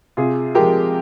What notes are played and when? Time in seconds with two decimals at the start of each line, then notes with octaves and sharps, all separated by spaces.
0.17 C3 F4 G#4
0.55 F3 G#3 G4 A#4